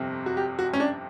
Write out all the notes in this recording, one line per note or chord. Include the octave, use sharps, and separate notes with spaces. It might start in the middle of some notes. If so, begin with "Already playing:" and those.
Already playing: G1 F2 C3
F#4
G4
F#4
C#4
D4